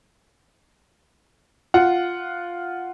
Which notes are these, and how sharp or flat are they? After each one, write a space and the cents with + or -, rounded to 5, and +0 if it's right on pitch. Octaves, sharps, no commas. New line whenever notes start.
F4 +0 F#5 +0